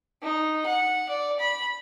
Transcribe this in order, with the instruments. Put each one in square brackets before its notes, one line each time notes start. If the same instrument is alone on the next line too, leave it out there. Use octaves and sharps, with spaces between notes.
[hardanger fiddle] D#4
F#5
D5
B5